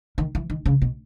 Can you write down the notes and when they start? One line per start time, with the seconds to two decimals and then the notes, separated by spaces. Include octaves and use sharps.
0.18 D#3
0.35 E3
0.50 D#3
0.66 C#3
0.82 B2